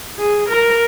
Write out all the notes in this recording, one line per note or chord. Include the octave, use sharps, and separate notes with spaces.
G#4
A#4